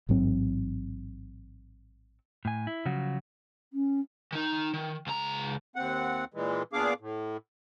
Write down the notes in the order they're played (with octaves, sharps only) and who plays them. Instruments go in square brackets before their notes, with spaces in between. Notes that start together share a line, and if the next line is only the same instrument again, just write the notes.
[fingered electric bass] A1 G#2 F#3 C4
[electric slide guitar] A2 G#5
E4
C#3 F3 F#3 F#4
[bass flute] C#4
[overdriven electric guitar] D#3 D#4
D#3
C#2 A#5
[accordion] D#2 C4 F#5
A#2 E3 G#3
A#2 B3 D4 G#4 F5 D6
A2